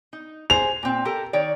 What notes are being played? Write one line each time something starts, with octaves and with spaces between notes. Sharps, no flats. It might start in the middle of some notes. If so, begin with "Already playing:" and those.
D#4
G#4 C5 F7
A#2 C4
G4 A4 A#4
D#3 C#5 D5